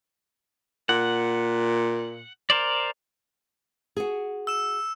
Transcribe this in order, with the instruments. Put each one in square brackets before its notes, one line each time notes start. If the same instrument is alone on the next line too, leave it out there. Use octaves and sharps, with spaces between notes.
[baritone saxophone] A#2 [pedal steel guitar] F#5
[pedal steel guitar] A#4 C5 D5
[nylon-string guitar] F#4 G#4
[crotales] E6 E7